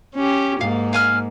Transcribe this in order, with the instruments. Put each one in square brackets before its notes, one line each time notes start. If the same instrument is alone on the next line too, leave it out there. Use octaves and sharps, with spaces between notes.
[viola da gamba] C#4 G4
[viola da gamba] G#2 A#3 [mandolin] F5
[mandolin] F5 G#5 F6